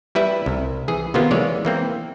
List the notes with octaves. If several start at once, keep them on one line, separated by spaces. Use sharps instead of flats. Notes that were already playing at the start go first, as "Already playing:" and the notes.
G3 E4 B4 E5
C2
E3 G#4
C3 D#3 A#3 B3 F4
E3 G#3 C#5 D5
E3 A#3 C4